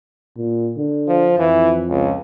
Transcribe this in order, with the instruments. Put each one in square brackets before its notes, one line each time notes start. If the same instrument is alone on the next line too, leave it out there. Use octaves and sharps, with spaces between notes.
[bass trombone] A#2
D3
[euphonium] F3
[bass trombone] F2 [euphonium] E3
[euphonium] C#2